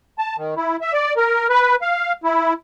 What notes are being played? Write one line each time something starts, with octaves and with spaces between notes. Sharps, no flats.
A5
D#3
E4
E5
D5
A#4
B4
F5
E4